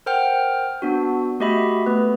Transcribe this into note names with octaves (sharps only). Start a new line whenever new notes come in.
A#4 C5 F#5 G5 F6
B3 D4 F#4
A3 F#4 G4 D#5 E5 B5
A3 B3 B4